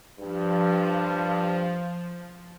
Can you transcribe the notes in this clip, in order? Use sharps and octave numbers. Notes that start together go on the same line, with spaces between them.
G2 F3